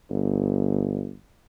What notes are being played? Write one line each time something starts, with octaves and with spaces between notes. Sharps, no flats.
G1